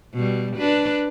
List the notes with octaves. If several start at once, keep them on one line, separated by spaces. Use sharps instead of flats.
B2 G3
D4 B4